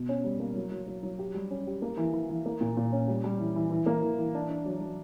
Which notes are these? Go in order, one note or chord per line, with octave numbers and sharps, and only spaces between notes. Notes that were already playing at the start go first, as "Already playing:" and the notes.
Already playing: B2
C#4
G3
A#3
F#3
F#3
F#3
F#3
G4
G3
C#4
G4
A#3
E3
E3
E3
A#3
A#2
A#2
C#4
G3
G3
E3
E3
E3
A#3
E3
E3
D4
D4
F#3
F#3